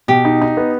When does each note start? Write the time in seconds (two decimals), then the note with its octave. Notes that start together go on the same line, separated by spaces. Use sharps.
0.08 B2 G4
0.25 D#4
0.41 D#4
0.57 B3